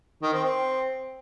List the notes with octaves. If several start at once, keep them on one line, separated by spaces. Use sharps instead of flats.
D#3
C4
C4